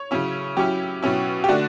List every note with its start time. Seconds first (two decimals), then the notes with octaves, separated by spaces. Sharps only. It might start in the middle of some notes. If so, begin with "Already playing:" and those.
Already playing: C#5
0.11 C#3 F#3 C#4 E4
0.57 F#3 C#4 E4 G4
1.02 B2 F#3 C#4 E4
1.44 G4
1.49 D3 A3 D4 F#4